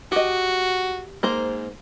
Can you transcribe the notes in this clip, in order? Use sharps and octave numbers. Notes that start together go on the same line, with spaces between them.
F#4 G4 D#5
G#2 A#3 A#4 C5